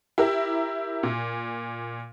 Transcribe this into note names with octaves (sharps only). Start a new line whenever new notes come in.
E4 G4 A#4
A#2